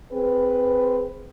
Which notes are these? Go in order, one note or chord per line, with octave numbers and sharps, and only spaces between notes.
C4 G#4 B4